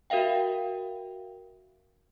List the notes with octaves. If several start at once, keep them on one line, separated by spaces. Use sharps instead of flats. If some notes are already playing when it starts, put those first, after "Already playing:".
F#4 A#4 E5 F5 G5